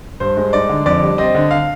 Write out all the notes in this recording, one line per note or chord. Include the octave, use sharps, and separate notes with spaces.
G2 C5
G#3
D#4 D5
D3
F2 D5
G3
C4 D#5
D3
F5